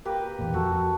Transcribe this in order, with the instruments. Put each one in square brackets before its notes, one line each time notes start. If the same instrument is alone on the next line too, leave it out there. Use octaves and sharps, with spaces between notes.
[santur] A#3 G4 B4
[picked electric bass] E2 A#2
[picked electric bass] F2 [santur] F#4 A4